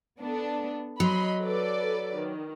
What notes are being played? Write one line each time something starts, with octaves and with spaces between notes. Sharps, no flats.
B3 D4 A4
F#3 D#5 B5 C6
A4 B4 D5
D#3